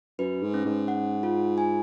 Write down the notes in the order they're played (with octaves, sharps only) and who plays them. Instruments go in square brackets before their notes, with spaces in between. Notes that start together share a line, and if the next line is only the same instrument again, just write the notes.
[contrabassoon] F#2 [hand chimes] B4
[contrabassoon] G#2
[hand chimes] C#4
[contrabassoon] G#2
[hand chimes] F#5
F4
G#5